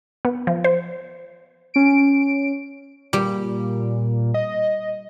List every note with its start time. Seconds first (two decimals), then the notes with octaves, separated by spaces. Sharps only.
0.25 B3
0.47 F3
0.64 C5
1.74 C#4 D7
3.13 A#2 G3
4.34 D#5